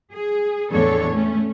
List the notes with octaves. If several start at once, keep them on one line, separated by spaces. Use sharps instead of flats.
G#4
E2 A2 D4 A4 C#5
A3 C#4